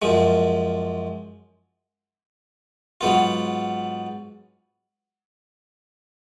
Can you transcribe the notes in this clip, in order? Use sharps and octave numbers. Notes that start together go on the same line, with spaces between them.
F#2 F3 G#3
G#2 F#3 B3 F4